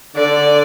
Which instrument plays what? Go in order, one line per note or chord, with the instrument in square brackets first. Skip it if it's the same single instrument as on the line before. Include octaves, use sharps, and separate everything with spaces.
[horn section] D3 [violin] D5